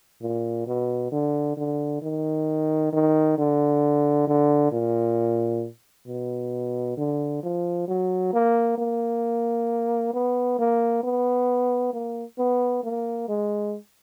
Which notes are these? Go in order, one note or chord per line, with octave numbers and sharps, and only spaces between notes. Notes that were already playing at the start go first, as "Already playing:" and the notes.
A#2
B2
D3
D3
D#3
D#3
D3
D3
A#2
B2
D3
F3
F#3
A#3
A#3
B3
A#3
B3
A#3
B3
A#3
G#3